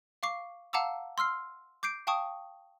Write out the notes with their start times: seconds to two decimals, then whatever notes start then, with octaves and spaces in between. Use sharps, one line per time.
0.23 F5 C#6 D6 C7
0.73 F5 F#5 A5 A#5 D6 E6
1.18 C6 E6 F6 C7
1.83 D6 G6 C7 D7
2.07 F5 G5 A5 C#6 D#6